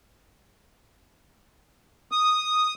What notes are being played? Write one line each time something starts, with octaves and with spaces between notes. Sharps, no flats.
D#6